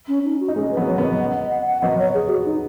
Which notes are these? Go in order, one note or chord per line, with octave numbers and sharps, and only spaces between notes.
C#4
D#4
F#4
D#4
G#3 C#4 G#4
B4
F#3 B3
C#5
F#3 B3 D#5
F#5
D#5
F#5
F#5
F#3 B3 D#5
C#5
G#4
F#4
D#4